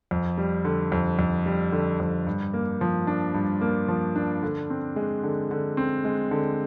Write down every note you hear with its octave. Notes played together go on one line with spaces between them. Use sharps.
F2
G3
D3
F2
F2
G3
D3
F2
G2
A#3
F3
D4
G2
A#3
F3
D4
D3
C4
G#3
D3
D3
C4
G#3
D3